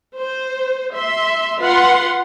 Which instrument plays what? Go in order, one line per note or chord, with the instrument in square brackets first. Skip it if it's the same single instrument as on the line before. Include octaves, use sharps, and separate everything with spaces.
[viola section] C5
E5 C6
F4 B4 F#5 C6